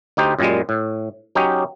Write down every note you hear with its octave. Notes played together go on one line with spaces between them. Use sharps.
D2 D#4 G4 C5
F#2 A#2 G3 G#3
A2
F#3 C#4 D#4 G4